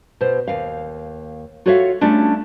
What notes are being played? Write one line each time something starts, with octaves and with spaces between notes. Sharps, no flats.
B2 C5
D#2 F5
F4 F#4 A4 C#5 E5 F5
G3 A3 C#4 D4 F4